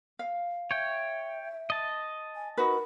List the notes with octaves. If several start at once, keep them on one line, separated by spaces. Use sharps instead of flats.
F5
C#5 E5 G5
D#5 A5
G#5
D#4 F#4 A#4 B4